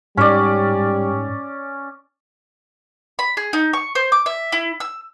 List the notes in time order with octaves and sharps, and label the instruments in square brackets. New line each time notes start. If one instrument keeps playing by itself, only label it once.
[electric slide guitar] G#2 [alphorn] G3 [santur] C#4 D5
[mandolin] B5
G#4
D#4
C#6
C5
D6
E5
E4
E6